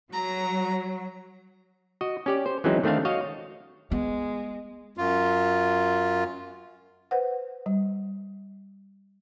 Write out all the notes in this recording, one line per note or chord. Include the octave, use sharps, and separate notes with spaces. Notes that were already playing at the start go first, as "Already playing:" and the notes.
F#3 A#5
F#4 D#5
C#4 G4 D5
C5
E3 F#3 G#3 C4 C#4 D#4
D#3 A3 C4 D4 F5
F#4 C#5 D#5 F5
G#3 B3
F#2 F4
B4 C5 F#5
G3